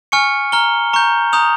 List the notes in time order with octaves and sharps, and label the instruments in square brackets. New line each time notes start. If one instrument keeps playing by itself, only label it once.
[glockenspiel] G#5 C#6 F6 C#7
A#5 F6 G7
A#5 C#6 G6
A#5 D#6 G6 F7